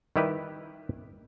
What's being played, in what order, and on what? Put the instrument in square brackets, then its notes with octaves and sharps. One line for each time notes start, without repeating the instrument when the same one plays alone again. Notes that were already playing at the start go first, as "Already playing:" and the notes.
[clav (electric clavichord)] D#3 G3 E4 G4 B4